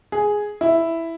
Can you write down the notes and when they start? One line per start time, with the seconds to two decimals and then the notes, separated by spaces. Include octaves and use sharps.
0.12 G#4
0.61 E4